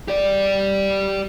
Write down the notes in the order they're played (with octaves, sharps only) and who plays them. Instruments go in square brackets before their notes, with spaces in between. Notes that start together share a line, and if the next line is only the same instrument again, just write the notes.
[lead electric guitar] G4 D5